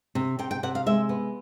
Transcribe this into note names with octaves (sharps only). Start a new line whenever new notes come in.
C3
C3 G5
G5
C3 F#5
F5
G#3 E5
B3